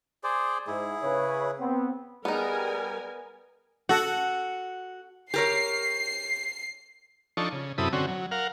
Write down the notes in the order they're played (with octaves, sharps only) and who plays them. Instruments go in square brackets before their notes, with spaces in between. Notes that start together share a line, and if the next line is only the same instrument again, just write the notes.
[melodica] G#4 C5 D5
[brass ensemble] G#2 [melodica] E4 G#4
[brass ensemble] C#3 B4 C#5
B3 C4
[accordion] G3 [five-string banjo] B3 D#4 [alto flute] G#4 [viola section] A#4 G#5
[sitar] F#4 [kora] A4 F#5
[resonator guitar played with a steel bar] G4 A#4 C#5 [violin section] C7
[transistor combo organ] F3 D4 D#4 A4 C#6
C#3
F#2 C3 E4 A4 B5 D#6
D3 C4 C#4 F#4
F#3
A#4 F5 F#5